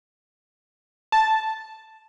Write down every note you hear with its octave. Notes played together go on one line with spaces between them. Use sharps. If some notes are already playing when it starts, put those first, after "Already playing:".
A5